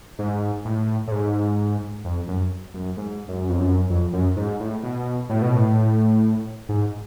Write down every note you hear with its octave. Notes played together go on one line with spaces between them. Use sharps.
G#2
A2
A2
G#2
F2
F#2
F#2
G#2
F#2
F2
F#2
F2
F#2
G#2
A2
B2
A2
B2
A2
G#2